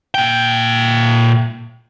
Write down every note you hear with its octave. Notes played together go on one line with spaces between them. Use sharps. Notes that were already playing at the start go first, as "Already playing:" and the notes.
A#2 G5